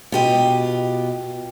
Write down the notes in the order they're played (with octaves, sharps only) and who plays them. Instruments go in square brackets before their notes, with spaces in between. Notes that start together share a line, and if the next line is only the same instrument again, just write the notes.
[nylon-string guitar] B2 [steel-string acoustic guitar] F4 G4 D#5